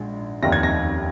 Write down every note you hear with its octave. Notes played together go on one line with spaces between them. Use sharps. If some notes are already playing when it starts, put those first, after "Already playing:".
Already playing: A#1 G#2
F1 D#2 D#3 A#6
G#6
A#6